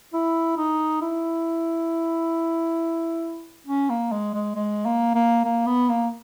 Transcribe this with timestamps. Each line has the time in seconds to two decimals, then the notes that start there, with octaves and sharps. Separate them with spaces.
0.13 E4
0.57 D#4
1.02 E4
3.67 C#4
3.90 A#3
4.12 G#3
4.34 G#3
4.56 G#3
4.86 A#3
5.15 A#3
5.45 A#3
5.67 B3
5.89 A#3